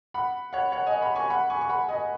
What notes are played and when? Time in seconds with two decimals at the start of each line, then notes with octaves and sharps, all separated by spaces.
0.14 F#5 B5
0.53 C#5 F#5
0.72 C#5 F#5
0.86 D#5 G#5
1.01 F#5 B5
1.15 G#5 C#6
1.30 F#5 B5
1.50 G#5 C#6
1.61 C#6
1.69 F#5 B5
1.89 D#5 G#5